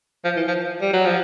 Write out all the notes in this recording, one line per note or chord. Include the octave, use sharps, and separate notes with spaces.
F3
E3
F3
G3
F#3
F3